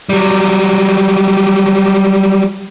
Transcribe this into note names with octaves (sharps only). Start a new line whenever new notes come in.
F#3 G3